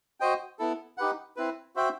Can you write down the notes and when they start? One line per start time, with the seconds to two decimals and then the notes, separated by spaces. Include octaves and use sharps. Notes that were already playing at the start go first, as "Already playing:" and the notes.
0.20 F#4 C5 D#5 G5
0.59 B3 E4 A4
0.98 D#4 G4 B4 F#5
1.36 C4 E4 B4
1.76 F#4 C5 E5 G5